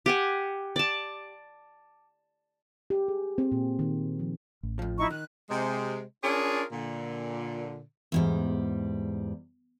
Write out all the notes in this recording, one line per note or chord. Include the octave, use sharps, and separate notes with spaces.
G4 F#5 G#5
D5 A5
G4
G#4
C4
A#2
D#3
F3
A1
F2 F3
D#4 E4 C#6
D#3 F#6
C3 G#3
C#4 D4 F4 G#4 A#4 C#5
A#2 D3
E2 G#2 G3